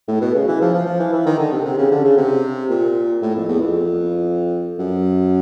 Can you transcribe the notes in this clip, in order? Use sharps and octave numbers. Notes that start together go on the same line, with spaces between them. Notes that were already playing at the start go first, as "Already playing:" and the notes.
A2
B2
C#3
E3
F3
F3
F3
E3
E3
D#3
D3
C3
C3
C#3
D3
C#3
C3
A#2
A2
F2
E2
F2
F#2